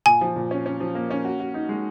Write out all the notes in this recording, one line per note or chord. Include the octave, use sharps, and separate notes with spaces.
A#2 G#5
F3
A#2
C#4
C#4
F3
A#3
C#4
F#4
F#4
D#4
G#3